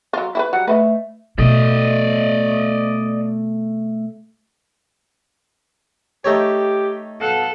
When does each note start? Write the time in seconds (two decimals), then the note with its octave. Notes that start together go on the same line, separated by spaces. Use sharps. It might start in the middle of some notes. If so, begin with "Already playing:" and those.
0.13 F#3 F4
0.35 E4 F#4 B4
0.53 F#3 G3 F#5
0.68 A3 B4 C5 D#5
1.38 B2 A3 D5 D#5
6.24 A3 D#4 G4 C#5
7.20 B2 A4 F5 F#5